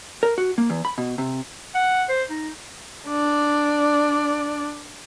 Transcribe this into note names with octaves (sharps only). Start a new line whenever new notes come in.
A#4
F#4
A#3
E2
B5
B2
C3
F#5
C5
D#4
D4 D5